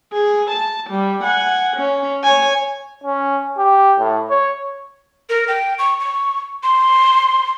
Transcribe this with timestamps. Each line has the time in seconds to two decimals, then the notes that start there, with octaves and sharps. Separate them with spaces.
0.13 G#4
0.50 A5
0.90 G3
1.22 F#5 G#5
1.76 C#4
2.24 C#5 G#5
3.04 C#4
3.57 G4
3.99 A2
4.30 C#5
5.29 A#4
5.48 G5
5.79 C#6
6.00 C#6
6.63 C6